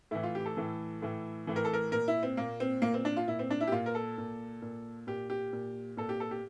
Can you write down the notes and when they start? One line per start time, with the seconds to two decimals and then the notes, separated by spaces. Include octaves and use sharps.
0.11 A2 E3 E4
0.23 F4
0.35 G4
0.46 A4
0.57 A2 E3
1.02 A2 E3
1.47 A2 E3
1.56 A#4
1.65 A4
1.73 A#4
1.92 A#2 A#4
2.08 E4
2.23 C4
2.37 A#2 A#3
2.60 C4
2.82 A#2 A#3
2.94 C4
3.05 D4
3.16 F4
3.28 A#2 E4
3.39 C4
3.50 D4
3.61 E4
3.67 G4
3.72 A#2 F4
3.86 A#4
3.95 A4
4.18 A#2
4.62 A#2
5.07 A#2 G4
5.30 G4
5.53 A#2
5.97 A#2 A4
6.09 G4
6.20 A4
6.31 G4